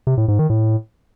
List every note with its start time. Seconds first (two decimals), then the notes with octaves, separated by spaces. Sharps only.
0.07 C3
0.17 A2
0.28 G#2
0.39 D#3
0.50 A2